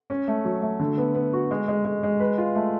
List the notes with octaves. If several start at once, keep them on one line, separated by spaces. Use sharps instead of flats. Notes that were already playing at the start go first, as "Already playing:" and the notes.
C#4
A3
F#3
A3
D3
B3
B3
F#4
G#3
G#3
G#3
G#3
B4
F4
A3